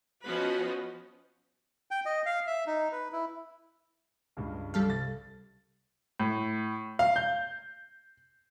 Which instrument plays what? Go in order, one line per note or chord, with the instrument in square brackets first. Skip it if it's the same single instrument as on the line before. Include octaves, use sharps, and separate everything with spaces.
[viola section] F3 B3 C#4 F#4 B4 D#5
[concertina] G5
D#5
F5
E5
D#4
B4
E4
[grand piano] C#2 G2
[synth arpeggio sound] G3 A4 F5
[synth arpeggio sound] C2 [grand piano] A6
[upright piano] A2
F5
G6